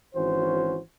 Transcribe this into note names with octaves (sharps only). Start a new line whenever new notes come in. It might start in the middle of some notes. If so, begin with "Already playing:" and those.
G#1 E3 C#4 F#4 C5